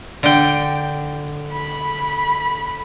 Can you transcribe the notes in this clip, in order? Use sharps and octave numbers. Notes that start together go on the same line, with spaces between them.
D3 G5
B5